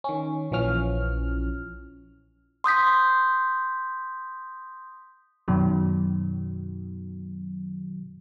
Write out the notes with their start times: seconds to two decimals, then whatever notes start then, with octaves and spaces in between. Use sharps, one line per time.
0.04 D#3 C#4
0.51 A#1 E3 F3 C#4 F6
2.64 C6 D#6 G6 B6
5.48 F#2 B2 D#3 F#3